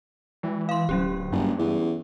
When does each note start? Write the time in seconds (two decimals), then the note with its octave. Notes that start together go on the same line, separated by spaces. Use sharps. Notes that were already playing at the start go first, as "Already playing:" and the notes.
0.43 E3 G#3
0.69 F5 C6
0.89 D1 F#3 C#4 G4
1.32 F#1 G2
1.59 E2